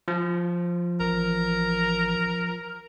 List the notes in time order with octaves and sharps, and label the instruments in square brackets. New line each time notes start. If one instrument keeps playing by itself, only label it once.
[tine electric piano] F3
[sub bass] A1 [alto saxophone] A#4